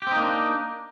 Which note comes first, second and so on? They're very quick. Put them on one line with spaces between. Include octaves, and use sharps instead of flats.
G4 C4 D#4 A#3 D4